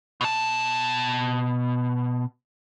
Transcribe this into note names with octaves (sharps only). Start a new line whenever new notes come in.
B2 A5